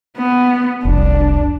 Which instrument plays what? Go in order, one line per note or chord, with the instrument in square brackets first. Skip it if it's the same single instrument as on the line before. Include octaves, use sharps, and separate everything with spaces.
[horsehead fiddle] B3
[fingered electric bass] F1 C2 [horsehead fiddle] D4